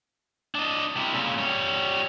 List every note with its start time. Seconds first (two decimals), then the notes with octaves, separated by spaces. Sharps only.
0.55 D4 D#5
0.97 C3 E4
1.13 A#2 C#3
1.38 G3 C#5